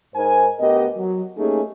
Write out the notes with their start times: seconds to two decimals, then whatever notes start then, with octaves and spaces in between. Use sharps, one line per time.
0.16 G#2 D#4 A#4 C5 G#5
0.60 D2 B3 G4 A#4 D#5
0.97 F#3
1.38 A3 A#3 C#4 D#4 G4 G#4